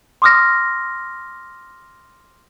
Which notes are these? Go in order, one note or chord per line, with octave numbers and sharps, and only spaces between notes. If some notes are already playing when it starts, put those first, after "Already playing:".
C6 D6 D#6 F6 A#6